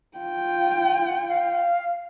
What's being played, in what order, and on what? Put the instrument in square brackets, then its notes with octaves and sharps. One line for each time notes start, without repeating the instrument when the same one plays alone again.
[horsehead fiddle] F4 G5
[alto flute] F5